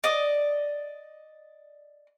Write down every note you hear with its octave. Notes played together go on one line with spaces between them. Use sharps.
D5 D#5